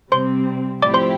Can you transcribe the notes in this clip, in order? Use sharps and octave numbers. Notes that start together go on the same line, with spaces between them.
C3 G3 C4 C5 C6
A2 F3 C4 E4 G4 D5 D6
C5 C6